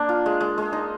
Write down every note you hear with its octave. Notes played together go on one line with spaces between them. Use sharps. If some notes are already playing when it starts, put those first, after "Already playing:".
Already playing: A#3 D4
F4
G#3
G#3
G#3
D#4